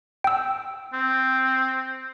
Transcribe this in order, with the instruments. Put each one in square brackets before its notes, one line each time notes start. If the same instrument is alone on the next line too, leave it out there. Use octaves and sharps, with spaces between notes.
[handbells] G5 E6
[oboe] C4